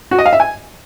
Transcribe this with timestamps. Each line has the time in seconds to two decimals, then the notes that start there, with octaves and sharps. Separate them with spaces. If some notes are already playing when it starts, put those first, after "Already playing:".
0.11 F#4
0.18 D#5
0.26 F5
0.33 E5
0.40 G#5